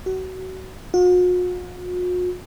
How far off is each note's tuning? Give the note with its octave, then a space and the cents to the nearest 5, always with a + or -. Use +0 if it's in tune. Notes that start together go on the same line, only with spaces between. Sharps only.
F#4 +25
F#4 -45